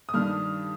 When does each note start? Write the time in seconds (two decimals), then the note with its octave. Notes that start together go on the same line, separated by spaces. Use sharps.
0.09 D#6
0.14 G2 D#3 G3 D4 F6